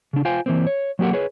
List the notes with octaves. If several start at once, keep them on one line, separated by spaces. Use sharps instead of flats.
C#3 D4
F4 C5 F5 G5 G#5
E3 A#3 C4
C#5
F#3 A#3 G4 A#4 F#5
G#4 B4 C#5